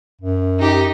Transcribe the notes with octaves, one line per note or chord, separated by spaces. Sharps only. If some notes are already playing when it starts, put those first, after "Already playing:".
F#2
D#4 G4